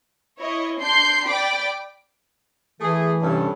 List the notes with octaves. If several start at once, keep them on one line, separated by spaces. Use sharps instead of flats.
E4 C#5 D#5
D4 C6 G6 C7
D5 G5 B5 D6
E3 A3 G#4
G2 C3 C#4 A4